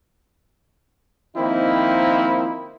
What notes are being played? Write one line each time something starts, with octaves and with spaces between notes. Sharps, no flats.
D#3 F3 A#3 C4 D#4 E4